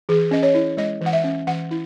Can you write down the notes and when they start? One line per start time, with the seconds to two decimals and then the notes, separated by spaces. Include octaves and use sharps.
0.09 E3 G#4
0.31 C#4 D#5
0.43 C#5
0.54 E4
0.77 G#3 D#5
1.01 E3 F#5
1.13 E5
1.24 C#4
1.47 E3 F#5
1.71 E4